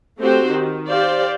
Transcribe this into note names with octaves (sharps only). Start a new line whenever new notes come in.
A3 C4 F#4 G4 C5
D#3
G4 C5 D5 F5